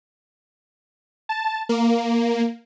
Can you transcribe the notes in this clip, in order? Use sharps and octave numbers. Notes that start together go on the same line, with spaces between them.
A5
A#3